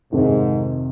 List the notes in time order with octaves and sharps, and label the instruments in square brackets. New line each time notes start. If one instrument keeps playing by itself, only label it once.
[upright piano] F2 C3 D#3 [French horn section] G#2